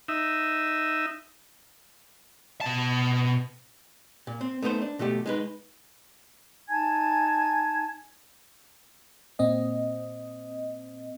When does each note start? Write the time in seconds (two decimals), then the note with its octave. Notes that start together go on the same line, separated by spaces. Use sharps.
0.08 D#4 E5
2.61 B2 A5
4.27 A#2
4.41 C4
4.62 A3 B3 D#4 A#4 C5
4.82 D4
4.99 B2 F3 A3 G4
5.26 G#3 D#4 B4
6.70 D#4 G#5 A5 G#6
9.39 A#2 C4 D#5